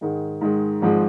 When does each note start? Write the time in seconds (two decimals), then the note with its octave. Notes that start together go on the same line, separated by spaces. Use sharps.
0.01 G#2 D#3 G#3
0.41 G#2 D#3 G#3
0.82 G#1 G#2 F3 G#3